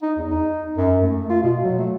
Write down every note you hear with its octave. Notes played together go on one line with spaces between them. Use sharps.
D#4
E2
D#4
F#2
A3
F4
B2
F#3
A3